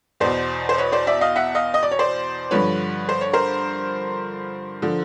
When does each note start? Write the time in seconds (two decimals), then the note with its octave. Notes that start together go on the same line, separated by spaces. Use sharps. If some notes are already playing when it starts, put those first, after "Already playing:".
0.20 E2 B2 C5 D5
0.69 C5
0.78 B4 C#5
0.92 C5 D5
1.07 D5 E5
1.21 D#5 F5
1.36 E5 F#5
1.55 D#5 F5
1.74 D#5
1.83 D5
1.91 C#5
1.99 C5 D5
2.51 G2 D3 F3 B4 C#5
3.09 C5
3.21 C#5
3.33 A#4 C5
4.82 D3 F3